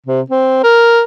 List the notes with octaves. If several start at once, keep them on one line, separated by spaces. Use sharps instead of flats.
C3
C4
A#4